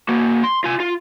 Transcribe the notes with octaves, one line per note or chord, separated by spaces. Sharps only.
A#3 F#4
C6
F4 G#5
F4